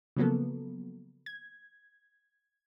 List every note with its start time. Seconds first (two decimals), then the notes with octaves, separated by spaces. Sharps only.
0.17 C#3 F3 F#3 A#3 B3 A4
1.26 G#6